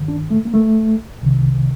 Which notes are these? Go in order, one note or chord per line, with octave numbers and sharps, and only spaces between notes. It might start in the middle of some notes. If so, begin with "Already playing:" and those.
Already playing: G2 D#3
D4
A3
A#3
A3
C2 C3 D#3